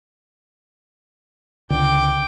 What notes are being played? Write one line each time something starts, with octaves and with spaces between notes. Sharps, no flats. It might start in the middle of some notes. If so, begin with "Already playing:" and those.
C#2 D3 G5 D6